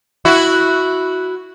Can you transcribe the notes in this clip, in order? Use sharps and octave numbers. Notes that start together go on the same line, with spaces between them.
E4 F#4